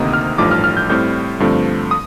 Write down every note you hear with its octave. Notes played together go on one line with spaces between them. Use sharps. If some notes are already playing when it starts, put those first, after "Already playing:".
Already playing: D2 C3 D#3 A#3 D#4 D#6
F6
A1 G2 F3 A3 D#4 D6
F6
F6
G6
A2 G3 C4 G6
G2 D3 F3 A3 C4
D#6